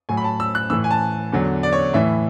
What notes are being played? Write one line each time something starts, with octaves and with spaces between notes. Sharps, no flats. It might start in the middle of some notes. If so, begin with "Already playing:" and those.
A2 F#3 G#5
B5
A5
E6
F#6
A2 E3 E6
G#5
A5
E2 D3 F#3
D5
C#5
A2 E3 E5